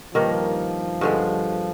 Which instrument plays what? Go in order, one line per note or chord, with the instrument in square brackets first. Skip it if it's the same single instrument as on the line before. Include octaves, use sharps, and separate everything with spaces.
[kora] G2 D#3 A#3 [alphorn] F3
[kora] G2 D3 G#3